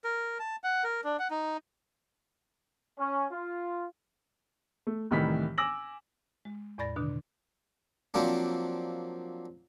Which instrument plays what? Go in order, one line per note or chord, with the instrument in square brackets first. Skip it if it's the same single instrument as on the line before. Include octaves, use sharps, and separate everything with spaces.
[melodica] A#4
A5
F#5
A#4
D4
F#5
D#4
[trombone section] C#4
F4
[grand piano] A3
C2 A2 D#3 E3 B5 B6
G#5 D6 E6 A#6 F#7
[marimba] G#3
E2 A2 D5 B5 A6 A#6
B2 D3 D#3 D4
[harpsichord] F3 F#3 A#3 C4 D4